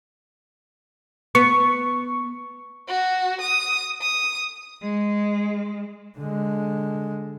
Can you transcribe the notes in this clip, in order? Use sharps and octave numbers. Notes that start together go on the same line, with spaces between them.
B3 C#6
F#4
D#6
D#6
G#3
D3 G#3